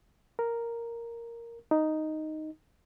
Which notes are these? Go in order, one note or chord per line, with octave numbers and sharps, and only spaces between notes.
A#4
D#4